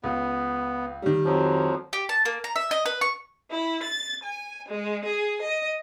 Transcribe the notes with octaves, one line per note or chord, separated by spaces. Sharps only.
C#2 B3
D#3 G3
F2 F3 F#3
G4
A5
A#3
A#5
E5
D#5
B4
C#6
E4
A6
G#5
G#3
G#4
D#5